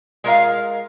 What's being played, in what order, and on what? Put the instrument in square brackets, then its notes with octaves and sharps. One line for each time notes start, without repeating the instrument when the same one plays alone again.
[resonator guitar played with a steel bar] G#3 F4 A#4 D5 D#5 F5